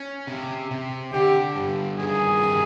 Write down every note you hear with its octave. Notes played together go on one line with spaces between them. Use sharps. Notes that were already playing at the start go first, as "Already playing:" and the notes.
Already playing: C#4
C3
C3
D3 G4
G2
D#3 G#4
C3